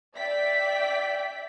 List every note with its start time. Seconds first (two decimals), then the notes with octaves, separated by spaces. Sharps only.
0.15 D5 E5 G5 B6